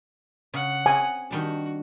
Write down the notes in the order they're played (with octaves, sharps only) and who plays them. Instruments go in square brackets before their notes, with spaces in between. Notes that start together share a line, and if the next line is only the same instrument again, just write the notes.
[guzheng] C#3 [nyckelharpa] F#5
[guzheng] C4 [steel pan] G#5
[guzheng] D#3 G3 D4 [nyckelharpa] F#4